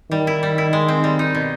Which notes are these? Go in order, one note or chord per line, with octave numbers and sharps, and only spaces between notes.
D#3 G3
E4
G3
E4
G#3
C4
G3
D#4
B2